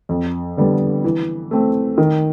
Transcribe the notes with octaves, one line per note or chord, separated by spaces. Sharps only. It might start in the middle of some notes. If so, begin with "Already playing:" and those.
F2
D3 G3 B3
E3
A3 C4
D#3